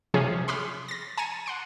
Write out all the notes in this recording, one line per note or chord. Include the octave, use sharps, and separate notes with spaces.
C3 F3 C#4 G#4
B5 C6 D6 F6
A6 A#6
G#5 A#5 A6 C#7 D#7
F#5 C6 D7